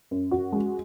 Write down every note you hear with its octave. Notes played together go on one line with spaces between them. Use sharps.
F#2
F#4
G#3